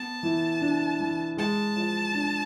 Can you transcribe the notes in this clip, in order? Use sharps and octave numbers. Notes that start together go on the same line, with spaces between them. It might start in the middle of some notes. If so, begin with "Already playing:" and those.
Already playing: B3 A5
E3
D4
E3
G#3 A5
F3
D4